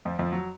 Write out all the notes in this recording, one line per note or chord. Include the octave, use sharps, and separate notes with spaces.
F2 F3
F2 F3
F#3